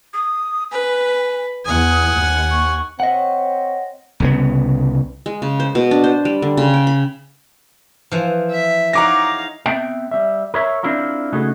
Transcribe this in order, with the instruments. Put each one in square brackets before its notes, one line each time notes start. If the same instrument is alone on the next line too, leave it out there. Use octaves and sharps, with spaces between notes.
[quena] D#6
[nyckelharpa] B4 [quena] G#5
[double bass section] E2 [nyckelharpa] F#5 G#5 [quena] D#6
[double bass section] D#2
[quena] C#6
[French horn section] C4 C#5 [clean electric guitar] D#5 F#5
[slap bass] C2 C#3 B3
[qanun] G#3
C#3
C5
B2
D4
C5
G3
D3
C#3
G5
B5
[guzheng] E3 F3
[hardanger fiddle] E5
[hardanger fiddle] D#4 F5 [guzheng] G#4 C#5 F#5 [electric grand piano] A#5 D6 A#6
[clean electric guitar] B3 C4 E5 G5
G3 E5
A#4 C#5 E5
C4 D4 E4 F4 A#4
C#3 A3 D#4 F#4 G#4